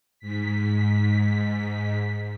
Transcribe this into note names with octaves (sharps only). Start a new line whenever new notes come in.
G#2 B6